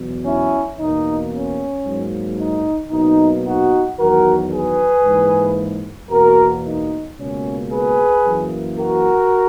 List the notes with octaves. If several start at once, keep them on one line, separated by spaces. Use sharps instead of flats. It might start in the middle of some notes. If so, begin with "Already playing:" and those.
Already playing: E2 B2 F#3
C#4 E4
E2 B2 A#3 D#4
C#4
G#2 F#3 A#3
D#4
B2 F#3 A#3 D#4
D#4 F#4
E2 D#3 F#3 F#4 A#4
G#4 B4
G#2 E3 A#3
E2 B2 A#3 F#4 A#4
D#4
C#2 B2 A#3 C#4
G#4 B4
F#2 E3 A#3
F#4 A#4